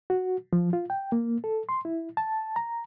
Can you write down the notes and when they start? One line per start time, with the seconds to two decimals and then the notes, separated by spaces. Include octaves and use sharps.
0.10 F#4
0.53 F3
0.73 F4
0.90 G5
1.12 A#3
1.44 A4
1.69 C6
1.85 E4
2.17 A5
2.56 A#5